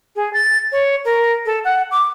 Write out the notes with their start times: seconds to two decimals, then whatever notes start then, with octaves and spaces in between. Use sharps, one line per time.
0.16 G#4
0.33 A6
0.72 C#5
1.05 A#4
1.46 A4
1.64 F#5
1.91 D6